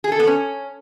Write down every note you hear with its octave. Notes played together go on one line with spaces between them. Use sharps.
G#4
A4
B3
C#4